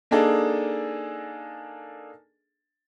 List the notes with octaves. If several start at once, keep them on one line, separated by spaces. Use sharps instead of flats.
A#3 D4 D#4 G#4 A4